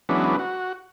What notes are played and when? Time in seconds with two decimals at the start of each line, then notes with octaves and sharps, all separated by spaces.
0.09 E3 F#3 G#3 B3 C#4 D4
0.39 F#4